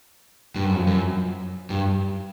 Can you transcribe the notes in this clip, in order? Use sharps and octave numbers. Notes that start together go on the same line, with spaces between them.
G2
F#2
F2
F#2
G2